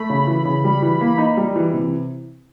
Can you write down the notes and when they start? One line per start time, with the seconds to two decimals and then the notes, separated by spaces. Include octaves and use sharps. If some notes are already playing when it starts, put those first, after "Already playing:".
Already playing: A3 B5
0.10 C#3
0.27 E3
0.45 C#3
0.64 G3
0.82 E3
1.01 A#3
1.18 D#4
1.37 G3
1.56 E3
1.73 C3